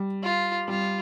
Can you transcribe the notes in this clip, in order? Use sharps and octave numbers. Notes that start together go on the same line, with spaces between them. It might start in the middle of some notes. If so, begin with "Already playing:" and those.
Already playing: G3
F4
G3 F4